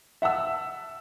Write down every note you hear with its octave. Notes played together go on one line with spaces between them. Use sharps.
E5 F#5 A5 E6